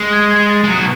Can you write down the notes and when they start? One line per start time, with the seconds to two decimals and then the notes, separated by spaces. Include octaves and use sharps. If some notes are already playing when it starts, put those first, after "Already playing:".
Already playing: G#3
0.13 G#6
0.31 G#6
0.50 A6
0.64 G#3
0.68 F#3
0.78 B2